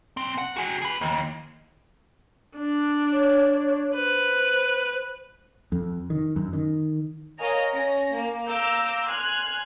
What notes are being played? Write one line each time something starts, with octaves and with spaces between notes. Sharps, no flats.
B1 C4
F#5
F#4 G#4
G#4 B4
D#2
D4
C#5
B4 C5
F2
D#3
F#2
D#3
A#4 C#5 D#5 F5 G#5 A#5
C#4 A#6
A#3
F5 A#5 D6 E6 G6
G#5 C6 F6 F#6 G#6